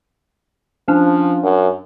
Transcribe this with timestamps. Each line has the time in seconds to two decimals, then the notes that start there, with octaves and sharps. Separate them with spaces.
0.88 F3 C#4 D4
1.43 F#2